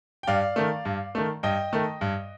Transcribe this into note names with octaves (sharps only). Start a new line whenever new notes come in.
G5
G2 D5 F5
D#3 A3
G2
D#3 A3
G2 D#5 G5
D#3 A3
G2